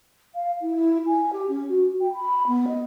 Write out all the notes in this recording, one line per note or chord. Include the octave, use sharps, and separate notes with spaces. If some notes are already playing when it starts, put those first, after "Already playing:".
F5
E4
G#5
G4
C#4
F#4
G5
B5
B3
D#5